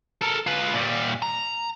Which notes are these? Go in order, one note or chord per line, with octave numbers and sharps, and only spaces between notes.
A4 A#4
F4 B4
A#2 G3
A#5